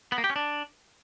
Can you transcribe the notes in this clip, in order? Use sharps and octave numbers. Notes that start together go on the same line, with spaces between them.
B3
A#3
G4
C#4
D4